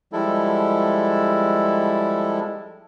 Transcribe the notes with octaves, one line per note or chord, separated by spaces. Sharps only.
F3 G3 G#3 E4 A4